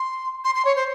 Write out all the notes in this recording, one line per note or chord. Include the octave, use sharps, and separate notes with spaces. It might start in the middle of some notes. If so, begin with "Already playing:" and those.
Already playing: C6
C6
C6
C#5
C5